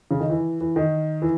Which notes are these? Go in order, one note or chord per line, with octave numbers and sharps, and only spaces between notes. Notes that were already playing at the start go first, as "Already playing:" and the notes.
C#3
D#3
E3
E3
D#3
E3